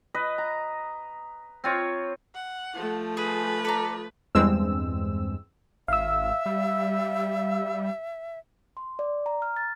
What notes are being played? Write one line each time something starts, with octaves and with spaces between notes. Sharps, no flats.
B4 D#5
A#5
C4 F4 C#5
F#5
F3 A3
G#4 B4
A4 D5 A#5
E2 G2 G#3 C4 E6
G#1 E5 F5 E6
G3
C6
D5
A#5
F6
A6